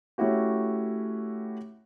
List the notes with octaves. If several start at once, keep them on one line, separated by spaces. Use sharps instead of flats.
A3 C#4 E4 F#4 G4